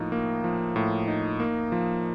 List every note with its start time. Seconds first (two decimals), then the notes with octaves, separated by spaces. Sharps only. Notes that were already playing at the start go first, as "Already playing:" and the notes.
Already playing: A2 F3 A#3 D#4
0.12 A#3
0.44 F3
0.76 A2
1.08 D#4
1.40 A#3
1.72 F3